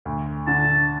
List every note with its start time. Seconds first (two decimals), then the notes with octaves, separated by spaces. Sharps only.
0.05 D2
0.47 D3 A5